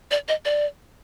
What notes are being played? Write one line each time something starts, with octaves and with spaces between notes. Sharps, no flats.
D5
D#5
D5